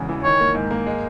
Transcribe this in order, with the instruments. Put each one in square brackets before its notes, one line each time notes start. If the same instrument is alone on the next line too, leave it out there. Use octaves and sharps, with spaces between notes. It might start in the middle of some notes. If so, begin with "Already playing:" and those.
Already playing: [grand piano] E1 E2 C#3
E3
[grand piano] D#3 [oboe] C#5
[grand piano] A#3
G#2
A#3
G#3